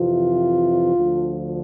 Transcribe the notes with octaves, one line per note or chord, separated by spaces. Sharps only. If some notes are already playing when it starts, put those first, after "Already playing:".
Already playing: F2 C3 E3 F4
D2 D3 F3